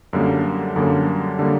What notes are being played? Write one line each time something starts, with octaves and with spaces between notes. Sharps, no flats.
F#2 D3 G3 A#3
F#2 D3 G3 A#3
D3 G3 A#3